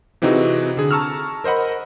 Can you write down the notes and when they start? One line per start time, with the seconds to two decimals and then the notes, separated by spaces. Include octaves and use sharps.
0.22 C3 E3 C4 D#4 F#4 G#4
0.77 D3 G#4
0.91 A5 A#5 C#6 E6 F6
1.44 A#4 C5 D#5 F#5 B5